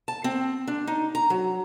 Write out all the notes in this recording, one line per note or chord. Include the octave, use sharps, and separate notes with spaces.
A5
C4
D4
D#4
A#5
F#3